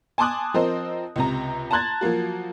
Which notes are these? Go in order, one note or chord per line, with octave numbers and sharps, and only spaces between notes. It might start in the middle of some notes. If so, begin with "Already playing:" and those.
G#5 A5 C6 D6 D#6 F#6
F3 C4 A#4 C5 D#5
C#2 C3 A#5
A5 A#5 C6 F#6 G#6 A6
F3 F#3 A#3 F#4